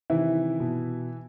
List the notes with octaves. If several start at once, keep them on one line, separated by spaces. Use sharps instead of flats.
C3 D#3 E3 E4
B2